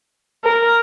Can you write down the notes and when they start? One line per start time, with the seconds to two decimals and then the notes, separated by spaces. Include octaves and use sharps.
0.44 A#4